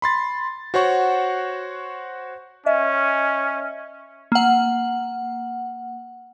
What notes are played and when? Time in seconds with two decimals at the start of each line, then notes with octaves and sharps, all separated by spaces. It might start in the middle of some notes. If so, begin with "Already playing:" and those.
0.02 B5 C6 A6
0.74 F#4 C5 C#5 F#5 C#6
2.66 C#4 D#5 E5
4.32 A#3 F#5